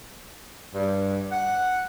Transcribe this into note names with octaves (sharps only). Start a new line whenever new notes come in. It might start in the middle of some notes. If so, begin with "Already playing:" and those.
G2
F#5